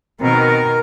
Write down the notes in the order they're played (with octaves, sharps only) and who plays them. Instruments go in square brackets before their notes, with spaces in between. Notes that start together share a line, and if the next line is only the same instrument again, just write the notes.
[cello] B2 D#3 [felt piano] C4 [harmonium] A#4